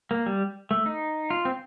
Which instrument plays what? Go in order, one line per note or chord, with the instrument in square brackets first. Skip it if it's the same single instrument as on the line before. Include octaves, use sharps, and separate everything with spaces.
[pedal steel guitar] A#3
G3
A3
D#4
F4
C4